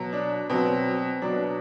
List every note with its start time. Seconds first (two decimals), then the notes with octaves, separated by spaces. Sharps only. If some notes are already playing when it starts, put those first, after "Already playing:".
Already playing: B2 F#3
0.13 D4
0.50 B2 F#3 C4
1.22 B2 F#3 D4